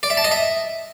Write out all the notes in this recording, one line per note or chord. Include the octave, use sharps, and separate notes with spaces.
D5
E5
A5
D#5
E5